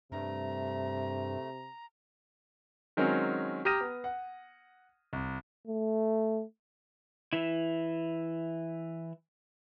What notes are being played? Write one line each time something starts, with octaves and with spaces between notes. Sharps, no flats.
G2 C3 A3 A#5
D#3 F#3 G#3 C4 C#4 A#4
G4 A#5 D#6 F6 A#6 D#7
B3
F#5
C2
A3
E3 E4